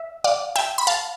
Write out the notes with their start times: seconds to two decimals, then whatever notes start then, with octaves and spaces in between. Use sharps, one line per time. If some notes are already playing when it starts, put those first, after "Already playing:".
Already playing: E5
0.24 D5 F5
0.56 E5 G5
0.78 B5
0.87 F5 A5